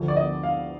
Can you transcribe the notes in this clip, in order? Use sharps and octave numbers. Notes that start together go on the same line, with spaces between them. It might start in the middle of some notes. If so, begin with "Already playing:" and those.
Already playing: D2 D3 F3
D5
D#5
F5